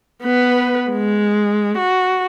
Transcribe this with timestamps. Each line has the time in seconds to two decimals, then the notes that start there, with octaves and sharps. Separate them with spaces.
0.23 B3 B4
0.91 G#3
1.78 F#4